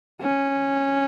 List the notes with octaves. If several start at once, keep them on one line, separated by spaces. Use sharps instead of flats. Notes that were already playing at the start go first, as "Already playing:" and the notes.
C#4